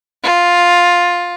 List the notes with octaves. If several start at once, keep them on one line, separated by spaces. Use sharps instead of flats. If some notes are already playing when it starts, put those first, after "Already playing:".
F4